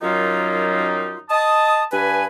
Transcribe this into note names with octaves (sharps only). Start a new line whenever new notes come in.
F#2 D#3 F#3 G3 D#4 F4
D#5 A5 D#6
G2 B4 G#5